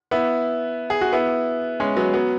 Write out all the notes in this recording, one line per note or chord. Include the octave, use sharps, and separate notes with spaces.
B3 E4
G#4
F#4
B3 E4
G#3 C#4
F#3 B3
F#3 B3